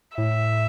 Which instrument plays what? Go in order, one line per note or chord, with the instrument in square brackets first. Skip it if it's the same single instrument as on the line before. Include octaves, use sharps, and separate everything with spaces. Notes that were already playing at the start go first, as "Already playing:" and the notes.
[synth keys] A2 [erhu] E5